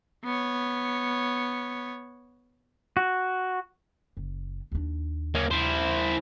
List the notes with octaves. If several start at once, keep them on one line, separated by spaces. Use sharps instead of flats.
B3 C#5
F#4
F#1
D#2 D4
A#3 C#4
E4 C5